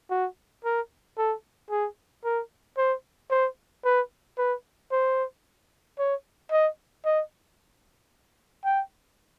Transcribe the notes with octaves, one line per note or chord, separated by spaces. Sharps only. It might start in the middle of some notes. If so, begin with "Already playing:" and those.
F#4
A#4
A4
G#4
A#4
C5
C5
B4
B4
C5
C#5
D#5
D#5
G5